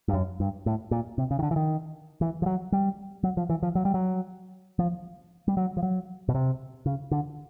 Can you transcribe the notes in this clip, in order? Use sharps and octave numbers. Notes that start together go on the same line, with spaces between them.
G2
F#2
G2
A2
A#2
C3
C#3
D#3
D3
E3
D#3
E3
F3
F#3
G3
F#3
F3
E3
F3
F#3
G3
F#3
F3
G3
F#3
F3
F#3
B2
C3
C#3
D3